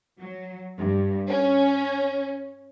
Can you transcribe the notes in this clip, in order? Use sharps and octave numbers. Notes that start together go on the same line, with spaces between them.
F#3
G2
C#4